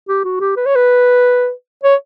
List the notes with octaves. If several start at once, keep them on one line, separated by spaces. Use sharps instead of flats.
G4
F#4
G4
B4
C#5
B4
C#5